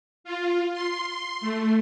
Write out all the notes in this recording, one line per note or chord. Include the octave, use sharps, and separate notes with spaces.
F4
C6
A3